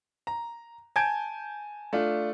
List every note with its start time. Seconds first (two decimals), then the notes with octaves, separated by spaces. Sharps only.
0.27 A#5
0.96 G#5 A5 G6 G#6 D7
1.93 A3 D4 F4